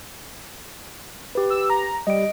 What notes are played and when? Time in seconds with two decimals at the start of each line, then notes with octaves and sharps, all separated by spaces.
1.35 G4 B4
1.50 E6
1.70 A#5
2.07 G3 D#5 D7